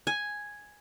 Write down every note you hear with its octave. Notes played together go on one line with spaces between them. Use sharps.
G#5